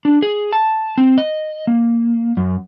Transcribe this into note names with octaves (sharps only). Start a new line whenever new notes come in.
D4
G#4
A5
C4
D#5
A#3
F#2